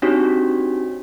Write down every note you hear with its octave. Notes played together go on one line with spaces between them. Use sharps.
C4 D4 D#4 F#4 G4 C#5